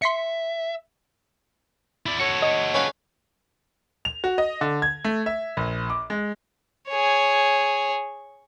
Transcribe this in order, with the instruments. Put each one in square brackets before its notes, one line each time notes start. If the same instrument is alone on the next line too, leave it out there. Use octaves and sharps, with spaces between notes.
[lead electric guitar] E5 [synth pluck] C6 B6 C#7
[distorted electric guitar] E4 D5
[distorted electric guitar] F#4 A4 [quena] C#5 [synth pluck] C#7
[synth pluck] D#5
[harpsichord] C#4 B4 F5
[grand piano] F7
F#4
D#5
D3
G#6
A3
E5
A#1
D6
G#3
[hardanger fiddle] G#4 C#5